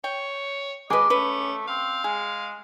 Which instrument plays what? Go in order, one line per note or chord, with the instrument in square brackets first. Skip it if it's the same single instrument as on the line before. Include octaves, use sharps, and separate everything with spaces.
[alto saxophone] C#5 [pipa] G5
[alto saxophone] G#3 [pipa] G#4 B4 [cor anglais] D#5 [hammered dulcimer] D6
[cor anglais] A3 [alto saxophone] C#4 [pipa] B4
[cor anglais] C4 [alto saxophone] F5
[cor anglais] G#3 [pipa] G#4